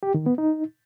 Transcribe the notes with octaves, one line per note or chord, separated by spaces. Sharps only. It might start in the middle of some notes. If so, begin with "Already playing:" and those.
G4
D#3
B3
D#4